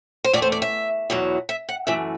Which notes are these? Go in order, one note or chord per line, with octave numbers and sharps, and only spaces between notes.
C5
E2 B2 A3 D5
C5
D5
E5
E2 B2 F#3
E5
F#5
F#2 E3 A3 E5